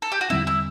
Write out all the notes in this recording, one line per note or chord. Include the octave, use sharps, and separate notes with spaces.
A4
G4
F#4
E2 D3 G3 C4 E4
E4